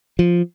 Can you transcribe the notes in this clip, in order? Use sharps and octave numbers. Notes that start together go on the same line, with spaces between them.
F3